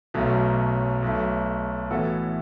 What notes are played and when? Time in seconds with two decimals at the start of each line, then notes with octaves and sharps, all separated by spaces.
0.14 B1 B2 F#3 A3
1.02 B1 B2 A3
1.90 A2 E3 B3 F#4 A4